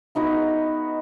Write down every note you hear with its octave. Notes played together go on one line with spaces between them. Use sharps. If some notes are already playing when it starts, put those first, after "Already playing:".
B3 D#4 F#4 B4